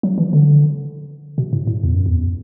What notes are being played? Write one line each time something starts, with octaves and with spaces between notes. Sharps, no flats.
F#3
E3
D3
B2
A2
A2
E2
F#2
E2